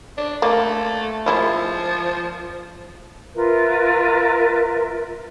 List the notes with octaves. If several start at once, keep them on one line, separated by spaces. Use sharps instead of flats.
D4
A3 A#3
F3 G#3 E4 F4
F4 A#4 B4 E5